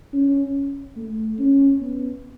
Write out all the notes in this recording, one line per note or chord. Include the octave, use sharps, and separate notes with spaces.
C#4
A3
C#4
B3